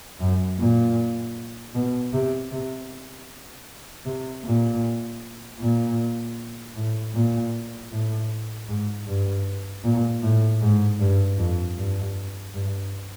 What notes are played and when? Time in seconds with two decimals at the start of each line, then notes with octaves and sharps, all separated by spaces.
0.20 F#2
0.59 A#2
1.75 B2
2.13 C3
2.51 C3
4.06 C3
4.44 A#2
5.60 A#2
6.76 A2
7.14 A#2
7.91 A2
8.68 G#2
9.07 G2
9.84 A#2
10.23 A2
10.61 G#2
11.00 G2
11.38 F2
11.77 G2
12.54 G2